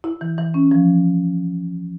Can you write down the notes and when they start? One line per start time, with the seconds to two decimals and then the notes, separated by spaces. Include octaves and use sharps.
0.04 E4
0.21 E3
0.38 E3
0.54 C#4
0.71 F3